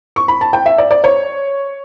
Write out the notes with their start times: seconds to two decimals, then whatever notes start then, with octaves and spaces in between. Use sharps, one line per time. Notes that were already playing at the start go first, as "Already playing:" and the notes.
0.16 C#6
0.28 B5
0.41 A5
0.53 G5
0.66 E5
0.78 D5
0.91 D5
1.04 C#5